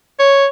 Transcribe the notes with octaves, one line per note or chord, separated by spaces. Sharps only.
C#5